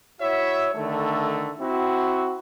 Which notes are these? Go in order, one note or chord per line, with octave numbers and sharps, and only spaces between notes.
E4 F#4 C#5 E5
D3 D#3 A3
C4 E4 F#4